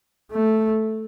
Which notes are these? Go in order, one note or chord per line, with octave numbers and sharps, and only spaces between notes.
A3